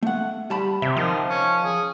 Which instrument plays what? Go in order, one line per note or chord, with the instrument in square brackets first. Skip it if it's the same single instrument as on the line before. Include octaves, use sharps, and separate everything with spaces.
[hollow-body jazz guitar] A3 F#5
G3 A5 B5
[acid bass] C3 [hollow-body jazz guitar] E5
[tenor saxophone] D#3 [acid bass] F3
[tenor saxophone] C#4
G#4